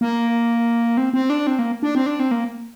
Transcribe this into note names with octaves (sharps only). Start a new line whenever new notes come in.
A#3
C4
C4
D4
C4
A#3
D4
C4
D4
C4
A#3